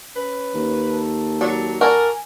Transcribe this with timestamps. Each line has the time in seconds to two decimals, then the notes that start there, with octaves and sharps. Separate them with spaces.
0.16 C#4 B4
0.54 D#2
0.90 A4
1.41 F#3 D5
1.81 F#4 A4 A#4 D5 G#5